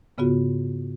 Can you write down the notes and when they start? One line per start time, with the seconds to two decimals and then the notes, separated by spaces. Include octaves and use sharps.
0.18 G#2 C#3 B3 F4 F#4